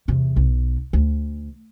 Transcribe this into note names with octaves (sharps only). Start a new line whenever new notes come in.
E2 C3
B1
D2